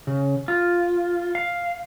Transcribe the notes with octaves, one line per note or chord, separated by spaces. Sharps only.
C#3
F4
F5